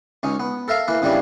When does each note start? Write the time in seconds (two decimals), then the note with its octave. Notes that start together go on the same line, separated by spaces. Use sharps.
0.23 C#2 C#4 D#4
0.40 B3
0.68 A4 A#4 E5 F5
0.88 E3 A#3 B4
1.02 F2 C#3 E3 G3 A#3 D4